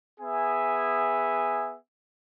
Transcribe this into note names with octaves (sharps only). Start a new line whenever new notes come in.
B3 G#4 E5 G#5